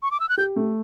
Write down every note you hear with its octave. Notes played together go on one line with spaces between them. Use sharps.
C#6
D6
E6
F#6
G4 G6
A3